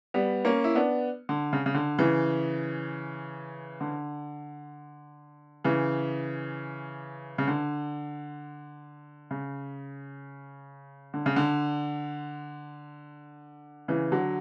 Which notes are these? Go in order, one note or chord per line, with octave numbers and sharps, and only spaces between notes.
G3 B3
A#3 C#4
E4
B3 D4
D3
C#3
C#3
D3
C#3 E3
D3
C#3 E3
C#3
D3
C#3
D3
C#3
D3
C#3 E3
D3 F#3